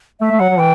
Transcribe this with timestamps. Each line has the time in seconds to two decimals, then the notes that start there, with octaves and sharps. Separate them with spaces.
0.21 A3 E5
0.31 A3
0.39 F#3 F#5
0.50 F#3
0.59 E3 G5